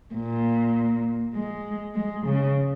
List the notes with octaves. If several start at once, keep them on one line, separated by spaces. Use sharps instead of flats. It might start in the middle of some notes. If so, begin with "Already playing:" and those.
A#2
G#3
G#3
C#3